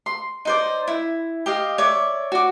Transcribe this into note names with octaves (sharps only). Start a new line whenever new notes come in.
C6
D#4 C5 D5
E4
G4 D#5 F5
C#5 D5 E5
F#4 D6